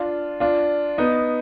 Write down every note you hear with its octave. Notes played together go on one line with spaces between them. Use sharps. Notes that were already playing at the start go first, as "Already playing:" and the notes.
Already playing: D4 F4
D4 F4
B3 D#4